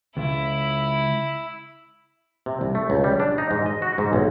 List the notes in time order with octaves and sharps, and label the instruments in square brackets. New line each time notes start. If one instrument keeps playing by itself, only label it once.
[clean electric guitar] C#2 [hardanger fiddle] E4
[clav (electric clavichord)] C3
C2
A3
C#2
G3
D4
D#4
G#2
D#5
F#4
G#2
B1